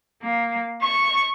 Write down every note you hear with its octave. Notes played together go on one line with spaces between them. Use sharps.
A#3
C#6